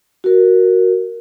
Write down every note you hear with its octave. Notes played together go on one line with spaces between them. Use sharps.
F#4 A#4